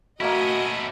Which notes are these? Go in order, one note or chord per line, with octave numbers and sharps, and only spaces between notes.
A3 A#3 C#4 E4 F#4 D#5 F#5